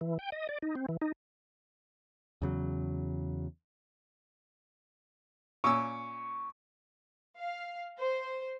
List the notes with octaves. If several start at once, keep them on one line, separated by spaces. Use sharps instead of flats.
E3
G5
D#5
D5
D#4
C4
E3
D#4
E2 C#3 F#3
A#2 C#4 C#6 E6
F5
C5